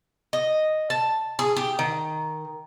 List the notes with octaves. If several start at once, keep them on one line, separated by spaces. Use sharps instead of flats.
D#5
A5
G#4
G4
D#3